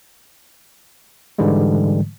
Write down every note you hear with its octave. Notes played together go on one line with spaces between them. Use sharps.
G#2 D3 E3 G3 G#3